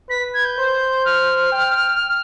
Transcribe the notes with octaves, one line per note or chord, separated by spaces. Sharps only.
B4 B6
G#6
G6
C5
F6
G5